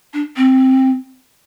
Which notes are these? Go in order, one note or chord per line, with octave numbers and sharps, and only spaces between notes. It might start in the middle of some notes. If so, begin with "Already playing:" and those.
D4
C4